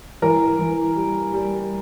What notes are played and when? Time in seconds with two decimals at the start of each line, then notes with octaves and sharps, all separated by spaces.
0.22 E3 A#4
0.59 E3
0.96 G3
1.33 G3